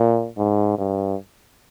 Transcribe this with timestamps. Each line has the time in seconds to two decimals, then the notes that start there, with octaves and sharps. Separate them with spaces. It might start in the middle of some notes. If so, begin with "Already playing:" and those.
Already playing: A#2
0.37 G#2
0.78 G2